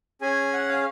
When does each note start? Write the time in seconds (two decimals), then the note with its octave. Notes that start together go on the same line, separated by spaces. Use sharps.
0.22 C#4 G#4 G#5
0.53 F#5
0.69 F5